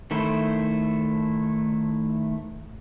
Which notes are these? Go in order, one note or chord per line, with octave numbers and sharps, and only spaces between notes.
D#3 A3 E4 A4 C5